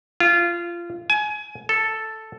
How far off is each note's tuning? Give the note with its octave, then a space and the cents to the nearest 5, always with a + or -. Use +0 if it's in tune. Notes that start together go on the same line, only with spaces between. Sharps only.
F4 -20
G#5 +25
A4 +0